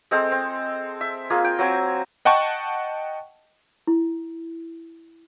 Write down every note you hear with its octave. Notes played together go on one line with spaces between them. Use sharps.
G#3 C4 A4 C5
C4
E5
A#3 F4 G#4
G5
F#3 C4 G#5
D#5 F#5 G5 A5 C#6
E4